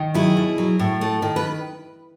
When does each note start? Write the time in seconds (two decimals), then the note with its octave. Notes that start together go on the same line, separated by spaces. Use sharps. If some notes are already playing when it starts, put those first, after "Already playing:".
Already playing: D#3
0.14 F#3 E4 G#4
0.37 B2
0.58 F#3
0.79 A2
1.01 A3
1.22 D#3
1.36 B4